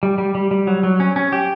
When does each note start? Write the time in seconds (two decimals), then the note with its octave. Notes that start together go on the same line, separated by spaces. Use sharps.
0.03 G3
0.18 G3
0.35 G3
0.51 G3
0.67 F#3
0.84 F#3
1.00 C#4
1.16 C#4
1.32 G4